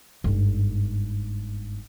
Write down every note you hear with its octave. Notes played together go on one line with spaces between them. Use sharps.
G1 G#2